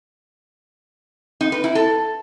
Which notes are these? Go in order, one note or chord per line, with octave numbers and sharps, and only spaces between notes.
D#4
B4
E4
A4